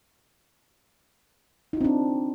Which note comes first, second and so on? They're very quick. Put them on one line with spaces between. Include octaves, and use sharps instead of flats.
D#4 F4 C4 D4